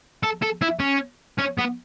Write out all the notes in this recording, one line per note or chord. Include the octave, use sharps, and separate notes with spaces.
A4
A4
E4
C#4
C#4
B3